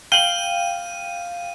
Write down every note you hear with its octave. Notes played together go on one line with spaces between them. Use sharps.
F5 G5 D#7 F#7 G7